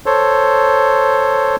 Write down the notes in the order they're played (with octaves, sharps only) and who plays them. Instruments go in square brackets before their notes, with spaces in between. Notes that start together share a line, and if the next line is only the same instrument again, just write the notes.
[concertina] A4 C5 C#5